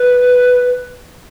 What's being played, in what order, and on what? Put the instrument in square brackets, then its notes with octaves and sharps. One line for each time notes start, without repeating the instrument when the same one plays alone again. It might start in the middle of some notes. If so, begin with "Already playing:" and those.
Already playing: [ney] B4